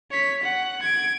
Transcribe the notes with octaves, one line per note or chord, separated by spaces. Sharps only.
C#5 B6
F#5
G#6 D7